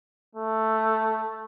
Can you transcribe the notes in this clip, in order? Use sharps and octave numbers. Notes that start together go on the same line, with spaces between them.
A3